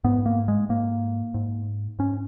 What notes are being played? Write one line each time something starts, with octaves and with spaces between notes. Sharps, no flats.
G#2 B3
A#3
G#3
G#2 A#3
G#2
G#2 C#4